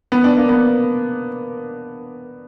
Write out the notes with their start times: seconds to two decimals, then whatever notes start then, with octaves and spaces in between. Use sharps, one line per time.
0.12 B3
0.24 D4
0.37 A#3
0.49 B3